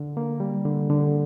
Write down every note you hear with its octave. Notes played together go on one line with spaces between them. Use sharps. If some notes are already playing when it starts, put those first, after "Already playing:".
Already playing: D3
A#3
G3
D3
D3